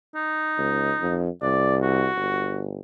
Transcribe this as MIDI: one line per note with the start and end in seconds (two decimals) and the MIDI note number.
0.15 1.25 63
0.58 0.92 37
1.00 1.29 41
1.42 2.08 36
1.42 1.76 74
1.82 2.66 66
2.16 2.81 31